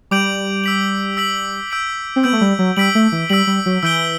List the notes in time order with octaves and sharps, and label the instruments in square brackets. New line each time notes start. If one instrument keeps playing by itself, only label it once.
[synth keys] G3 [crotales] D6 G6 D7 F#7
[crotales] E6 B6 F#7
E6 B6 F#7
E6 G6 D7 F#7
[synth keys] C4
[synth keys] B3 [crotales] E6 G6 D7 F#7
[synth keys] A3
G3
F#3
[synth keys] G3 [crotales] E6 B6 D7 F#7
[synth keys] A3
E3
[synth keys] G3 [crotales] E6 B6 D7 F#7
[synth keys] G3
F#3
[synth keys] E3 [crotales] E6 G6 D7 G7